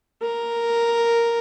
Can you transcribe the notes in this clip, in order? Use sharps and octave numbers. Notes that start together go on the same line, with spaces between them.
A#4